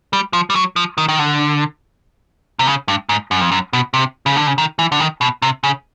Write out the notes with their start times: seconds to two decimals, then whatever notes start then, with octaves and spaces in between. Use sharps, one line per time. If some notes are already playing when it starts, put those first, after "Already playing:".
0.13 G3
0.33 F3
0.50 G3
0.55 F#3
0.76 F3
0.98 D#3
1.09 D#3
1.19 D3
2.59 C3
2.67 C#3
2.88 G2
3.09 G#2
3.31 F#2
3.41 F2
3.52 F#2
3.73 B2
3.94 C3
4.26 C#3
4.36 D3
4.47 C#3
4.58 D#3
4.79 E3
4.92 D3
5.00 D#3
5.21 B2
5.42 C3
5.64 C#3